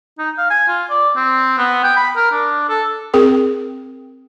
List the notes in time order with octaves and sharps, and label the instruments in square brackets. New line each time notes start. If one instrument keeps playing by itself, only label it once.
[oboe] D#4
F5
G#5
F4
D5
C4
B3
G5
B5
A#4
D4
A4
[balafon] C4 G#4 A#4 G5